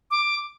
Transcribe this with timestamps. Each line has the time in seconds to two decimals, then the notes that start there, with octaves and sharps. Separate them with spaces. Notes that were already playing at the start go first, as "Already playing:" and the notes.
0.11 D6